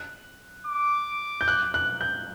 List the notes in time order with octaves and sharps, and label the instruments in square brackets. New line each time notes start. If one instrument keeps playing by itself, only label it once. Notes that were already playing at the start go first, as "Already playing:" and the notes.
Already playing: [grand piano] F#6
[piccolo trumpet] D6
[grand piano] G6
F#6
F#6
G6